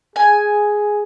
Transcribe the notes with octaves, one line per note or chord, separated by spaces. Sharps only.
G#4 G#5